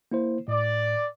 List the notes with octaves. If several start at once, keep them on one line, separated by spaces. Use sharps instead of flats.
A#3 E4 C5
A2 D5